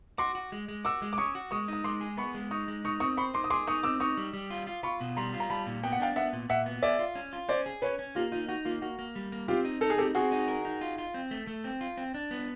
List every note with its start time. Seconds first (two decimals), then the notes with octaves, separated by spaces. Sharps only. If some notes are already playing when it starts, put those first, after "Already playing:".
0.18 F#4 C6 D6
0.35 F#4
0.52 G#3
0.68 G#3
0.85 F#4 D6 E6
1.02 G#3
1.13 D6
1.18 C#4 C#6 D#6
1.35 F#4
1.51 G#3 C#6 D#6
1.68 D#4 D#6
1.84 G#3 C6 D6
2.01 G#4
2.17 B3 B5 C#6
2.35 G#3
2.51 D#4 C#6 D#6
2.68 G#3
2.84 D#4 C#6 D#6
3.00 C4 C#6 D#6
3.17 C5 B5 C#6
3.34 D#4 C6 D6
3.44 D#6
3.50 G#4 C6 D6
3.67 D#4 C#6 D#6
3.83 C4 D6 E6
4.00 D#4 C#6 D#6
4.17 G3
4.33 G3
4.50 F4
4.67 F4
4.83 F4 B5 C#6
5.01 B2
5.17 G3 A#5 C6
5.34 F4
5.40 A#5
5.50 G3 A5 B5
5.67 A#2
5.83 B3 G5
5.92 F#5
6.00 D4 F5 G5
6.16 B3 E5 F#5
6.33 A#2
6.49 A#2 E5 F#5
6.66 B3
6.83 G#4 D5 E5
6.99 F4
7.15 C#4
7.33 F4
7.49 C#4 C5 D5
7.66 G#4
7.82 C#4 B4 C#5
7.99 C#4
8.15 A#3 F4 G4
8.32 D#4 F4
8.48 D#4 F#4
8.65 A#3 F4
8.82 A#3 F#4
8.99 A#3
9.16 G3
9.32 A#3
9.48 C4 F4 G4
9.65 D#4
9.81 D#4 A4
9.90 G#4
9.98 C4 G4 A4
10.15 C4 F#4 G#4
10.32 D#4
10.48 A#4
10.65 D#4
10.81 F4
10.98 F4
11.14 C4
11.31 A3
11.47 A3
11.64 C4
11.81 F4
11.97 C4
12.14 D4
12.31 B3